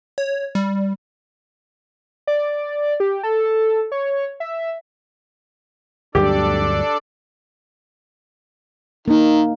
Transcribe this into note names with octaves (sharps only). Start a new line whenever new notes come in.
C#5
G3
D5
G4
A4
C#5
E5
D2 G2 F#3 D4 G4 A4 D5
D#3 A#3 D#4